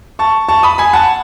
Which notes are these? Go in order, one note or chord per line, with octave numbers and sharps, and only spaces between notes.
A5 C#6
A5 C#6
B5 D#6
G#5 B5
F#5 A5